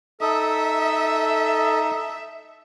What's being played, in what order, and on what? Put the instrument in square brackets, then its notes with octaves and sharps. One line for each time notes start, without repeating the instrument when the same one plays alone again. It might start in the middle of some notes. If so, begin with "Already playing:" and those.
[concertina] D#4 D#6 [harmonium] A4 [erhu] E5